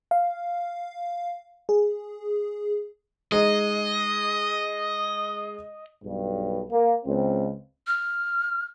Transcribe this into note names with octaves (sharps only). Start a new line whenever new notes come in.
F5
G#4
G#3 D#4 D#5
B1 G2
A#3
C#2 C4
F6